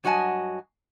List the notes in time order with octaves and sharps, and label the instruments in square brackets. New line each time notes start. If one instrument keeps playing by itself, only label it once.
[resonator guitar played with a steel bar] G2 F#3 F#4 D#5 G#5 A5